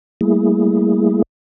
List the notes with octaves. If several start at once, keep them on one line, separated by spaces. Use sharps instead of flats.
G3 A3 A#3 E4 G#4